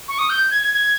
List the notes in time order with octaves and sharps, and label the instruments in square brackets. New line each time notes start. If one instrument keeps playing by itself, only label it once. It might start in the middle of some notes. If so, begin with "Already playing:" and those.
[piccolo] C#6
D#6
G6
G#6
G#6
G#6